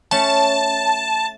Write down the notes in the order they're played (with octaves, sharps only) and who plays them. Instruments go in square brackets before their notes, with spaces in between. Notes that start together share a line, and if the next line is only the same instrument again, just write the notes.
[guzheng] A3 C#4 [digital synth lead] A5